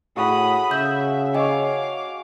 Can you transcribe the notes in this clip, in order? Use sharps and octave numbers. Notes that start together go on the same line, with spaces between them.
A2 F#4 G#4 B5 D#6
C#3 E5 G6
C#5 D#5 F5 G5 G#5 D6